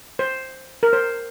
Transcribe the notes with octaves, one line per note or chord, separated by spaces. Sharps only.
C5
A#4
C5